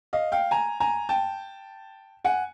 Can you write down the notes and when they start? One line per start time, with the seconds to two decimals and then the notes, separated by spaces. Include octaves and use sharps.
0.13 D#5 F5
0.32 F5 G5
0.51 G#5 A#5
0.80 G#5 A#5
1.09 G5 A5
2.25 F#5 G#5